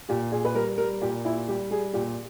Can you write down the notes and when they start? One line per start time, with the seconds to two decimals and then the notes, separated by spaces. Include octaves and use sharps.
0.09 A#2 G4
0.32 A#2 G#4
0.45 B4
0.55 G3 A#4
0.78 G3 A#4
1.01 A#2 G4
1.25 A#2 E4
1.48 G3 G4
1.71 G3 G#4
1.93 A#2 G4